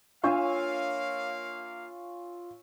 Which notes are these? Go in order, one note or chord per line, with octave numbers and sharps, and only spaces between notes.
A#3 D4 F4 C#5 E5 F5 G#5 C#6